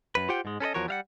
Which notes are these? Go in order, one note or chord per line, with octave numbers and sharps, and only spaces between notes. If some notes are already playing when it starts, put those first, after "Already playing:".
F#2 B4
F4 G4 C5 F#5 G5
G#2 G#3
C#4 A4 B4 D#5
E2 F3 F#4 A#4 C#5
G3 F5 F#5